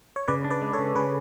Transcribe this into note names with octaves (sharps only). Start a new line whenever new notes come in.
C#5
C#3 B4 D5
D4
B4 D5
G#3
A4 C#5
C#3
C#3 G#4 B4